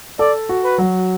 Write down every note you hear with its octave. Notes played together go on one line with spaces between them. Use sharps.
A4 D5
F#4
B4
F#3